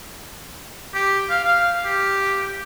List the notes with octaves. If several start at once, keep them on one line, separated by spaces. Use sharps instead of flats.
G4
F5
F5
G4